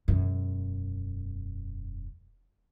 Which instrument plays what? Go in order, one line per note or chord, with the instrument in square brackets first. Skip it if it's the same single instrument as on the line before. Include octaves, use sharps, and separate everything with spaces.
[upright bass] E1 F#2